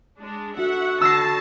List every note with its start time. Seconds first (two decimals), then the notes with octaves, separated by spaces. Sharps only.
0.20 G#3 D4
0.57 D4 F#4 A4 E5 F#5
1.01 D3 F#4 A5 E6 A#6 C7